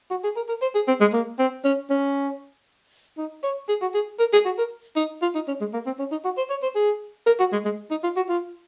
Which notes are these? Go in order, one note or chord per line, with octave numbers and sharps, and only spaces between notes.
F#4
G#4
A#4
A#4
C5
G#4
C4
G#3
A#3
C4
C#4
C#4
D#4
C#5
G#4
F#4
G#4
A#4
G#4
F#4
A#4
D#4
F4
D#4
C#4
G#3
A#3
C4
C#4
D#4
F#4
C5
C#5
C5
G#4
A#4
F#4
G#3
G#3
D#4
F4
F#4
F4